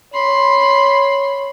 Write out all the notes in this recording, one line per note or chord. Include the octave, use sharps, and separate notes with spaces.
C#5 B5 C6